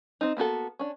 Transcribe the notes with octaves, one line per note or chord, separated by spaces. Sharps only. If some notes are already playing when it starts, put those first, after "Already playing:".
C4 D#4
A#3 B3 F#4 A4
C#4 D4